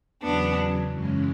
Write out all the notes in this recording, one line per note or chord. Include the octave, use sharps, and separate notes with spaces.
E2 C#3 F#3 B3 D4
F#2 C#3 E3 G#3 C#4